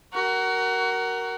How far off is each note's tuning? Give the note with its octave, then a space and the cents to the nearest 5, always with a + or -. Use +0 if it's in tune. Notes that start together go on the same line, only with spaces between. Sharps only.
F#4 +25 A#4 +0